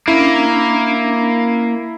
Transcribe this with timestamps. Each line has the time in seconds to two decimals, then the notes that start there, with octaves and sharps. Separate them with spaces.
0.08 A#3 C#4 D4 E4